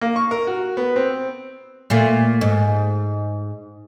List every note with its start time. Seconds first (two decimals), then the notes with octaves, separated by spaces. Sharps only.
0.01 A#3
0.16 C#6
0.31 A#4
0.47 F#4
0.77 B3
0.96 C4
1.90 A#2 A3 F4
2.41 G#2